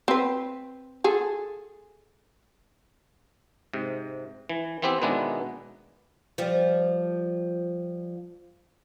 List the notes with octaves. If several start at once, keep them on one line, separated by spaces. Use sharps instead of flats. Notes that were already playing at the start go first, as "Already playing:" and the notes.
C4 B4
G#4 A4
G#2 C3
E3
E3 B3 C4 G4 E5
B2 D#3 G#3 B3 D4 E4
F3 G3